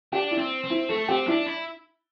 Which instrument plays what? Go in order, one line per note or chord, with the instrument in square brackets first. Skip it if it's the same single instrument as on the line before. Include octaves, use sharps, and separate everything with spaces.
[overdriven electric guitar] D4 [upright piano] G4
[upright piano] E4
[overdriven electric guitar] C4
C4
[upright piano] E4
[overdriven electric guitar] A3 [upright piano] A4
[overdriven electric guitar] C4 [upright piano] G4
[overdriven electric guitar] D4 [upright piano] E4
[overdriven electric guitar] E4